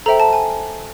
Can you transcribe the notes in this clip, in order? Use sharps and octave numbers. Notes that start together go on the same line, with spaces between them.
A4 C5 E5 G5 A#5
A5
G#5